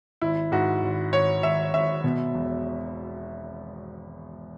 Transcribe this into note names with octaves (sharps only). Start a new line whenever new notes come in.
G#1 E4
G#2 F#4
G#1
G#1 C#5
G#1 E5
G#1 E5
B2
E1